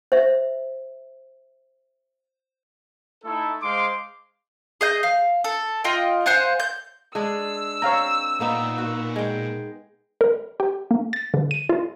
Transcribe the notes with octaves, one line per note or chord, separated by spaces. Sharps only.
C5 E5
A3 D#4 E4 A4
G#3 C5 F5 C6 D6
G#4 D#5 G6
F5
A4
F4 D#5 G5
C5 F5 F#5 G#5
G6
G#3 D4 G#4 E6
C4 C#5 F5 A#5
A#2 A#3 B3 D#4
F#4
G#3 G5
A#4
G4
A#3
A6
D3
D#7
F4